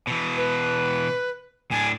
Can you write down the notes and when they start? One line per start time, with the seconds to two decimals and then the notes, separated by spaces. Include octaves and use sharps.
0.07 B2 E3
0.37 B4
1.71 A2 D4 G#5